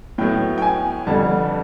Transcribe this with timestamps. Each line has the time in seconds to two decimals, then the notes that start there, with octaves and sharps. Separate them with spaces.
0.18 A2 F#3 B3 G5
0.58 G5
0.62 G#5
1.07 F2 D3 G3 B3 A5